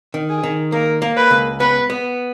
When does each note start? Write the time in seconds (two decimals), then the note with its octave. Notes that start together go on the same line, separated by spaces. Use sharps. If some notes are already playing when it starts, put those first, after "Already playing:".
0.14 D#3
0.29 G#4
0.43 D#3
0.72 A#3 A#4
1.02 A#3
1.17 B4
1.31 C#2
1.60 B3 B4
1.90 B3